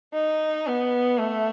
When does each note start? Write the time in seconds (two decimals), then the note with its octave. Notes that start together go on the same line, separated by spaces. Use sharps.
0.14 D#4
0.67 B3
1.20 A3